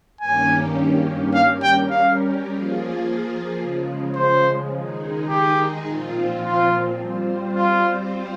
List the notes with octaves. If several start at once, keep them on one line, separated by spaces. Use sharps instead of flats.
G2 D#3 A#3 C#4 G4 G#5
G3 C#4 G4 A#4 F5
G5
F5
F3 A#3 F4 G#4
C#3 F3 G#3
C5
D#3 G#3 D#4 G#4
G4
A#2 F3 C4 F4
F4
G3 C4 F4 C5
F4